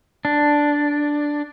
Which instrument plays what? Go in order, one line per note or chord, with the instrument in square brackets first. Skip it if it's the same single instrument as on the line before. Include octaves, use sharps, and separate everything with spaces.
[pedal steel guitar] D4